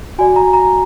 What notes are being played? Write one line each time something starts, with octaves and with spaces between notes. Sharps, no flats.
F#4 D5 G#5
A#5
A#5